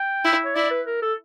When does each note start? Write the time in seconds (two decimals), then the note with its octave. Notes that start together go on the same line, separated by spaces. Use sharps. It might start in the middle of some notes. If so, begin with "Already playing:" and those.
Already playing: G5
0.25 E4
0.45 C#5
0.55 E4 D5
0.71 B4
0.87 A#4
1.02 A4